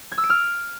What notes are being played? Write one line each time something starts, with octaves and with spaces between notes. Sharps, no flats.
G#6
E6
D7
F6